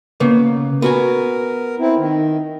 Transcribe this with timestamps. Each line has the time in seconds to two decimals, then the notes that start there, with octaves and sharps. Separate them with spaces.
0.20 C#3 A#3 B3
0.82 B3 F#4 A#4 G#5
1.79 C4 E4
1.97 D#3